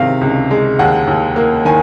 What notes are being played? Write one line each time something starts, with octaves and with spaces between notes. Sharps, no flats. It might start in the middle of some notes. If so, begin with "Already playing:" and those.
Already playing: C3 D#3 G#3 F5
C#2
G#3
D#2 F#5
D#2
A#3
D#3 G#5